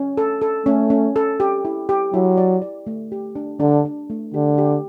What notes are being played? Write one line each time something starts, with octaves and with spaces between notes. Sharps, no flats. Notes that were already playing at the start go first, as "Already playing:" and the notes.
Already playing: C#4
A4
A4
A3 C#4
C#4
A4
G4
E4
G4
F#3 E4
D5
D5
A3
G4
D4
D3 D4
D4
A3
D3 G4
G4